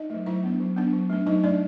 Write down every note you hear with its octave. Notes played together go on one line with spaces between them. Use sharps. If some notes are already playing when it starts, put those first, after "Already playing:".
Already playing: D#4 D#5
F#3 A3
F#3 E4 E5
B3 D4
F#3
B3 D4
F#3
A3 D4
F#3 D#4 D#5
A3 D4 D5